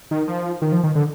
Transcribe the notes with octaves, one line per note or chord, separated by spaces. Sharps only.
D#3
F3
D#3
F3
D#3
D3